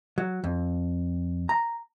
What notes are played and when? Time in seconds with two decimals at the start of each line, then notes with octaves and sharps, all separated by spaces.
0.18 F#3
0.44 F2
1.49 A#5